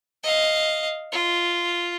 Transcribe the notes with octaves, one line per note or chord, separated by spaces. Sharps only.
D#5 F5
F4